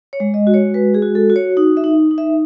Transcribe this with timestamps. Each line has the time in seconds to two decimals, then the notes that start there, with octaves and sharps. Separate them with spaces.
0.13 C#5
0.20 G#3
0.34 D#5
0.47 F#4
0.54 C#5
0.74 G#3 B4
0.94 G#4
1.02 F#4
1.15 A4
1.30 F#4
1.36 C#5
1.57 D#4
1.77 E5
1.84 D#4
2.11 D#4
2.18 E5